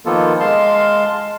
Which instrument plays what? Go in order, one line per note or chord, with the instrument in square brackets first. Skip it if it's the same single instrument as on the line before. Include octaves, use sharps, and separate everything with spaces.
[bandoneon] D#3 F3 A#3 B3 F4 A4
G#3 F5 A5 C6